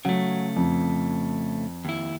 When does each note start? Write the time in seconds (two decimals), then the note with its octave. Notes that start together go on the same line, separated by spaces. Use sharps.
0.05 C#3 F#3 A3
0.56 F2
1.85 D#2 E4